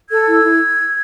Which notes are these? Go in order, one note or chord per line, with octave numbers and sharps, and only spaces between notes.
A4 E6 G#6
E4
E4